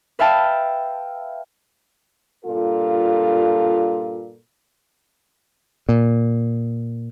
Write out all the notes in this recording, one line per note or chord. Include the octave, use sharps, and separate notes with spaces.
B4 E5 F5 G5 A5
G2 A#2 F4 A4
A#2